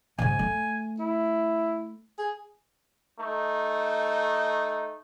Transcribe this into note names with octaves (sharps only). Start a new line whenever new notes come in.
G#2 C#3 G#5
A3
E4
G#4
A3 D#4